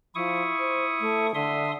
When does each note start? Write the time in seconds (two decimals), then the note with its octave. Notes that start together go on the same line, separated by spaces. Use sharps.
0.15 F3 E4 C#6 D#6
0.59 C5
1.00 A3
1.35 D3 E5 C6 D#6